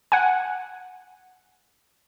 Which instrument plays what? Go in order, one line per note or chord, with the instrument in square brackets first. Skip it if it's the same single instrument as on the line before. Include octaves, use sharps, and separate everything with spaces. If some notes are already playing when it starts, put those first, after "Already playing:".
[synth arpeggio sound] F#5 G#5